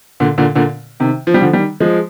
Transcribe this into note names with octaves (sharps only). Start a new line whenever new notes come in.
A#2 D3
A#2 D3
A#2 D3
C3 D#3
F3
G3
D3 F3
D#3 G3
F3 G#3